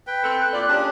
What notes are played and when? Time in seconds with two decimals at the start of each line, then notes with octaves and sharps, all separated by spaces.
0.07 B4 G5
0.24 C4 A4
0.42 F#6
0.53 A#2 F4 D5
0.68 C#4 D4 G4 G#4